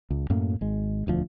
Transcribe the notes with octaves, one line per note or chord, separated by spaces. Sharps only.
C#2
F#2 A2 A#3
G#1 G#3
E1 D2 F3